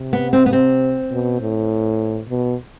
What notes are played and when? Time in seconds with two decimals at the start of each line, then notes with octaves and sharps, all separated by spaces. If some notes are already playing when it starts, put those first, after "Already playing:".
Already playing: C3
0.13 B3
0.33 C4
0.46 B3
0.53 C4
1.11 B2
1.41 A2
2.29 B2